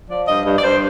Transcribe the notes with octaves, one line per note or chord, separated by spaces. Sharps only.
F3 D5
G2 D#5
G2
D5
G2 C5